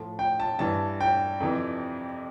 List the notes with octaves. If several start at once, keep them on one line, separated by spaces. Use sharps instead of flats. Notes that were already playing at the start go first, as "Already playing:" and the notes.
Already playing: A2 F3
G5
A5
G2 E3 A5
G5
F2 C3 E3